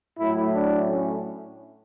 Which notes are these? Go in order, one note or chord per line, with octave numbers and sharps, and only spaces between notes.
A2 F#3 A3 E4
D4
C#4